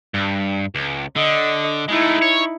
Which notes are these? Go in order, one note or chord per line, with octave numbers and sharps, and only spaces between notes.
G2
C#2
D3 D#5
G#3 A3 D#4 E4
C#5